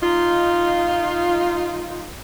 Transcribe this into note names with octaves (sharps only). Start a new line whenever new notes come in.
D#4 F4